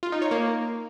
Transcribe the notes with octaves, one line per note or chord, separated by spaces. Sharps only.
F4
D#4
C#5
A#3